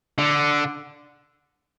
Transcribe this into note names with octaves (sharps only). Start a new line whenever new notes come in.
D3